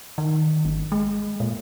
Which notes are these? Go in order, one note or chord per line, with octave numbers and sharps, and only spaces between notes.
D#3
G1
G#3
A#2